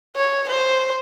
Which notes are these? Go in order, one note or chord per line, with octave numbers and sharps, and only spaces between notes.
C#5
C5